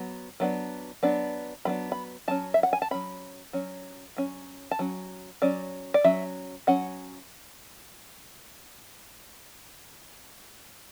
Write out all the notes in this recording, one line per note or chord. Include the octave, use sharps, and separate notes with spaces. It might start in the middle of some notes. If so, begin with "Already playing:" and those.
Already playing: F#3 B3
F#3 B3 D4
F#3 B3 D4
F#3 B3 D4 B5
B5
F#3 C#4 A5
E5
F#5
G#5
A5
F#3 C#4 B5
F#3 C#4
F#3 C#4
A5
F#3 C#4
F#3 C#4 D5
D5
F#3 C#4 E5
F#3 C#4 F#5